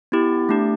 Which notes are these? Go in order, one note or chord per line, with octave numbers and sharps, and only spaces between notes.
B3 E4 G4
A3 D4 G4